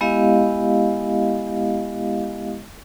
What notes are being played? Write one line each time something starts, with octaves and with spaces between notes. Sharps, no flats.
G#3 B3 E4 G4 D#5 F5